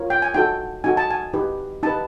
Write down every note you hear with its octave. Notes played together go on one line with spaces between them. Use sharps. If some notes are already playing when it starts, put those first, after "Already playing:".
Already playing: F4 A#4 C#5
G5
G#5
D#4 F#4 A4 G5
D#4 F#4 A4 G#5
A5
G#5
D#4 G4 B4
D#4 G4 B4 A5